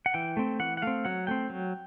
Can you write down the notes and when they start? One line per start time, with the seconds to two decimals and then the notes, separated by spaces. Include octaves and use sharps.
0.06 F#5
0.14 E3 G5
0.37 A3 C4
0.60 E3 F#5
0.77 F#5
0.82 A3 C4 F5
1.05 F#3 F#5
1.27 A3 C4 G5
1.50 F#3